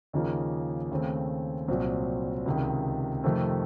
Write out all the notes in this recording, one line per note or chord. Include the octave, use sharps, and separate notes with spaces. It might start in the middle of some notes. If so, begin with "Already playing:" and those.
D#2 C#3 F3 A#3 D#4
D#2 C#3 A3 C4
C2 A#2 F#3 C4
C#2 C3 D#3
F2 C3 D#3 A3 C4